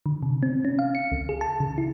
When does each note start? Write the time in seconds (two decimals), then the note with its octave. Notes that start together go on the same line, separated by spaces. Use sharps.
0.06 D3
0.23 C3
0.43 C4
0.65 C#4
0.79 F5
0.95 C#7
1.12 C#2
1.29 G#4
1.41 A5
1.60 C#3
1.78 E4